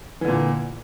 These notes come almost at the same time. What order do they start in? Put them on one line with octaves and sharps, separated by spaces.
E3 D3 A#2